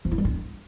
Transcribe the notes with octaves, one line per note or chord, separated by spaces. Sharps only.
F3
E4
G3
D4